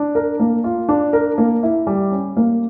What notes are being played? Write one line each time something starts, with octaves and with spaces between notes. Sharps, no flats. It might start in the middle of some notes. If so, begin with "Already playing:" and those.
Already playing: D4
A#4
A#3
F4
D4
A#4
A#3
E4
G3
C#4
A#3